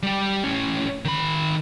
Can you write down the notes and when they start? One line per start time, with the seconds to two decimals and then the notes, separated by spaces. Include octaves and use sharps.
0.03 G3 G4
0.44 A2 C#4
1.05 D#3 B5